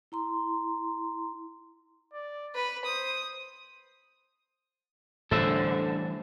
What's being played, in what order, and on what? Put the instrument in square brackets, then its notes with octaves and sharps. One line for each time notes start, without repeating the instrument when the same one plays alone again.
[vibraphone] E4 A#5 C6
[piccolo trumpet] D5
[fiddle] B4 [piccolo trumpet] B5
[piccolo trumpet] C5 [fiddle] D#6
[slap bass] A2 E3 G3 [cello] D3 [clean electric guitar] A4 C5 E5